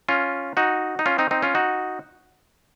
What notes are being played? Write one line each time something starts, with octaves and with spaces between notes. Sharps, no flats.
C#4 F4
D#4 F#4
D#4
C#4 F4
C4 D#4
C4 D#4
C#4 F4
D#4 F#4